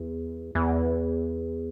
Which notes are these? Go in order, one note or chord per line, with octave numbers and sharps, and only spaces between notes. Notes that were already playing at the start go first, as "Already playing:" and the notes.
Already playing: E2
E2